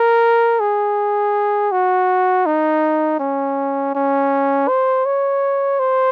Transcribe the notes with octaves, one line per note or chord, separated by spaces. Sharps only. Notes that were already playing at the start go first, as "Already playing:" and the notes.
Already playing: A#4
G#4
F#4
D#4
C#4
C#4
C5
C#5
C5